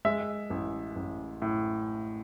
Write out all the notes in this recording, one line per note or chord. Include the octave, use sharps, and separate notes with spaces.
G#3 E5
A1
A1
A2